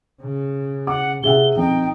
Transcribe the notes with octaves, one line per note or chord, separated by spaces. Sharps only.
C#3
F#5 D6
C3 G#4 E5 F#5 G7
F2 D#4 G5